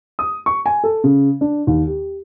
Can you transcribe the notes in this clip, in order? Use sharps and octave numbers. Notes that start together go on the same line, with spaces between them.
D#6
C#6
G#5
A4
C#3
D4
D#2
G4